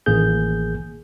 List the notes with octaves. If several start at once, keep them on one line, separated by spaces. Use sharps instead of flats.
A1 D#3 A#3 G#4 G6